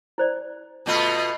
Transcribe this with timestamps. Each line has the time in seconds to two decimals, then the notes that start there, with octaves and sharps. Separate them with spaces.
0.18 E4 C5 D5
0.86 B2 A3 F4 D#5 B5